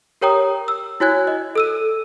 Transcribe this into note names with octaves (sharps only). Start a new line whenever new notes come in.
G4 A#4 C#5 G5 A#5 D#6
E6
E4 F#4 C#5 G#5 F#6 G#6
D#5
A4 E6 D#7